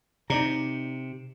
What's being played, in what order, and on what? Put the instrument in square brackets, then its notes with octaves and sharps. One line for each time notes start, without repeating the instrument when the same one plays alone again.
[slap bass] C3 [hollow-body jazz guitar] D#4 D5 A#5